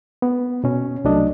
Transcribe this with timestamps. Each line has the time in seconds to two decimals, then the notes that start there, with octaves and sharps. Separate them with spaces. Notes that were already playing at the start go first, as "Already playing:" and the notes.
0.22 B3
0.64 B2 C#4
1.04 C2 F#3 A3 D4 D#5